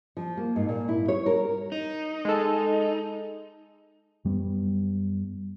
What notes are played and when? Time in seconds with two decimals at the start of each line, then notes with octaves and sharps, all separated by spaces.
0.17 F3
0.37 A#3
0.56 G#2
0.69 A#2
0.89 E4
1.08 C#5
1.26 A#4
1.72 D#4
2.25 G#3 A4
4.25 F#2 G3 B3